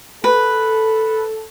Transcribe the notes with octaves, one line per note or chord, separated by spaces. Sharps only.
A4 B4